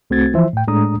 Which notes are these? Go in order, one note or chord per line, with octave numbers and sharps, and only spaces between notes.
C2 A3 C4 F#4 G#6 A6
E3 F3 C5 E5
A2 G5
A2 G#3 A3 D4 A#5 D#6